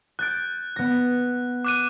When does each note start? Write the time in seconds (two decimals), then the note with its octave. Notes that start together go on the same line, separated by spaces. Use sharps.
0.19 F#6 G6 A6 D7
0.76 B3 A#6
1.65 D6 F#6 D#7